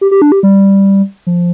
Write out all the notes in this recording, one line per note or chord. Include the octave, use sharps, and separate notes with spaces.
G4
G4
D4
G4
G3
F3